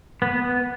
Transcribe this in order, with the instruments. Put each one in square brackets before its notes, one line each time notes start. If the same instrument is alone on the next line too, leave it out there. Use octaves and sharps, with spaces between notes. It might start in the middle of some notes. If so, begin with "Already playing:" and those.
[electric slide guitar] B3